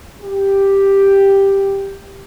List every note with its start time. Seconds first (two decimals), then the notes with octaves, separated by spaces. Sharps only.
0.21 G4